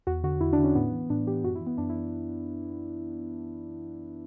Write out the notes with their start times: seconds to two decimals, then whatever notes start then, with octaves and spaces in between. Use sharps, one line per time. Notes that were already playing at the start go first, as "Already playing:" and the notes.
0.07 E2 F#4
0.24 D3 F#4
0.41 E2 E4
0.53 D4
0.58 D3
0.64 C#4
0.75 A2 B3
0.92 E3
1.10 A2 D4
1.27 E3 G4
1.44 F#2 F#4
1.55 E4
1.61 E3
1.67 B3
1.78 F#2 D4
1.90 E4
1.95 E3